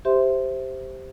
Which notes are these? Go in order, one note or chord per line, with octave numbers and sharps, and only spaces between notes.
G4 C5 E5 C6